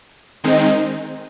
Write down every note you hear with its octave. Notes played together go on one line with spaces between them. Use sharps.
D#3 G#3 C4 D#4